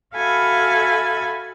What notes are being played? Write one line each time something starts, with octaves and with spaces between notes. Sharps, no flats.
F#4 A4 E5 F5 G#5 B5